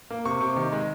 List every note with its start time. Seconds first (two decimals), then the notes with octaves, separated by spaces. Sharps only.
0.10 A#3
0.25 C3 C#6
0.40 C3
0.56 D#3
0.72 G#3